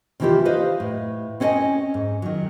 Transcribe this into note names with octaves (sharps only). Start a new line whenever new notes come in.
C3 D#3 E3 E4 F4 G4
B4 C5 D#5 F5
A2
C4 C#4 C5 D5 D#5 G#5
G#2
D#3 F#3